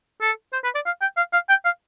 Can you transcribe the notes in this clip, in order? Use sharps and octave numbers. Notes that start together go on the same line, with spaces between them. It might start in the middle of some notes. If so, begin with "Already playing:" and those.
A4
C5
B4
D5
F5
G5
F5
F5
G5
F5